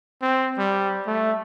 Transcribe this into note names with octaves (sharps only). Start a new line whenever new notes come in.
C4
G3
A3